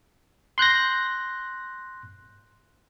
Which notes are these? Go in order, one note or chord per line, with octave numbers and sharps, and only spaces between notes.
C6 F#6 G6 A#6